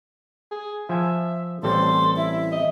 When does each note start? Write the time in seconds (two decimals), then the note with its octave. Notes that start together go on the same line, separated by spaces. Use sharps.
0.51 G#4
0.89 F3 E5 G#5 A5
1.63 A1 G3 C4 A4 C6
2.17 E4 E5
2.52 D#5